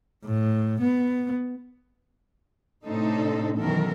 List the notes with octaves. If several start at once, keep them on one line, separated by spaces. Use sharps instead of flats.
A2
B3
A2 C3 D4 D#4 A4 C5
F#2 B2 D#3 E3 A4 A#4